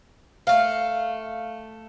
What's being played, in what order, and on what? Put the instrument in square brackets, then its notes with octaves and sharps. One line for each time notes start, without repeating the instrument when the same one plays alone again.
[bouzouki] A3 F5